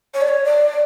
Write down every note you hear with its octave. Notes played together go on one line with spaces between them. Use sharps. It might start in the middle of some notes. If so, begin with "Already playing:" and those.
C#5
D5
C#5
D5